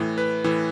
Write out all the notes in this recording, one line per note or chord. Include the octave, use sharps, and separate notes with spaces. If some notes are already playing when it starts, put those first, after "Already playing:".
Already playing: A2 E3
B4
A2 E3